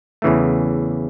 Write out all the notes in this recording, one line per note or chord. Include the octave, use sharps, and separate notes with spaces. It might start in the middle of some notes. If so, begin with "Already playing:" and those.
E2 C#3 E3 A3